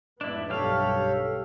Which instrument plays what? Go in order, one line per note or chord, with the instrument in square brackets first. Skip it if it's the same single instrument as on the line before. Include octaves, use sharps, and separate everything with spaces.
[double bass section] F1 G#2 B3 [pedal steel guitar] D4 E4
[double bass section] B1 G2 G3 [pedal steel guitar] G4 F5 [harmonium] A4 C#5